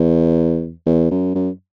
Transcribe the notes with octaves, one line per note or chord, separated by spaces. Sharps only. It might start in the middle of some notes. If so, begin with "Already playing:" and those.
Already playing: E2
E2
F#2
F#2